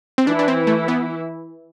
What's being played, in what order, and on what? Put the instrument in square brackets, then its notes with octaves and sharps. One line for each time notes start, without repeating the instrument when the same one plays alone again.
[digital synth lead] C4
[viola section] E3 E4 [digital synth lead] D4
[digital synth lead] D4
C4
A3
B3